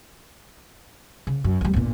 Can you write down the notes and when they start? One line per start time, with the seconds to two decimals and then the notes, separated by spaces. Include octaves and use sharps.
1.27 C#3
1.44 F#2
1.61 D2 G3
1.73 G1 A#2